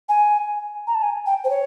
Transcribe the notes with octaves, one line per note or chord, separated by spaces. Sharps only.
G#5
A#5
A5
G#5
G5
C5
C#5